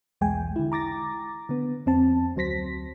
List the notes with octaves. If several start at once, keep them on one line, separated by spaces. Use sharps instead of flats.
B1 E2 G#3 G5 G#5
D3 E4
A#5 D6 A6 A#6
D3 B3
F2 C4 A5
D2 F#3 C5 A#6 B6